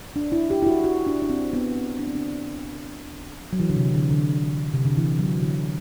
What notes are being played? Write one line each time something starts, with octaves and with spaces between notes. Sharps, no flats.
D4
E4
G4
E4
F#4
F#4
D4
D4
C4
B3
C4
D4
C4
D4
F#3
E3
D3
C3
D3
D3
C3
D3
E3
F#3
D3